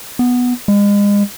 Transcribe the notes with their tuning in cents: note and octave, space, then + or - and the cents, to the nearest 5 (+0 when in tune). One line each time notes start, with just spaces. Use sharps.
B3 +0
G#3 -35